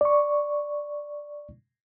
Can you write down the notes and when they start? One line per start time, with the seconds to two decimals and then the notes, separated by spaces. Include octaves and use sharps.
0.01 D5 C#6